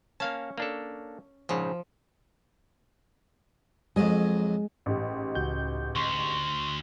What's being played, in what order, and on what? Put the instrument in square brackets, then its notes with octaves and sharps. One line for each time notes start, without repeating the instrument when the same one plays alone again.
[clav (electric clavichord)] A#3 F5 A5 [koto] C#4
[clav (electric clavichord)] A#3 D4 A4
[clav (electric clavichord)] A#1 G#2 C#3 [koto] F3
[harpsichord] F2 F#3 D#5 [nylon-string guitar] G#3
[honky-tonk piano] A1 G#2 G4
[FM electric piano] C#2 F#4 G6
[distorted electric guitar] D2 [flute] C6 [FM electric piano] C#6